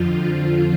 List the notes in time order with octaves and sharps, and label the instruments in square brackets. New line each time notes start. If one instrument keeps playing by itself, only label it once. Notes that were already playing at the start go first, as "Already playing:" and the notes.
Already playing: [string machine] F2 D3 F3 F4